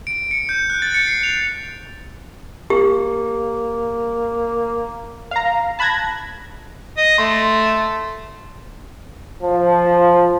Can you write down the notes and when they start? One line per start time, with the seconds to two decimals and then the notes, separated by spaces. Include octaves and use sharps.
0.07 D7
0.31 C#7
0.49 G6
0.70 F#6
0.82 A6
0.94 C#7
1.07 C7
1.23 F7
2.70 A#3 G4
5.31 F5 A#5
5.79 A5 B5 F#6 G#6 A#6
6.97 D#5
7.18 A3 C6
9.43 F3